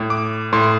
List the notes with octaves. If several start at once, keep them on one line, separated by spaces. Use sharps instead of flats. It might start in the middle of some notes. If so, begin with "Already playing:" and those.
Already playing: A2
D6
A2 C6